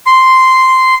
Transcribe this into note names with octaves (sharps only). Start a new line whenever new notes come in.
C6